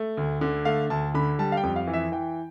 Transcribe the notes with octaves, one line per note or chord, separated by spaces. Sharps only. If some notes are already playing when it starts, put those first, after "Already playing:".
Already playing: A3
D2
D3
A3 F5
D2 A5
D3 B5
G3 A5
F5
G5
F2
F5
E3
E5
E3 G5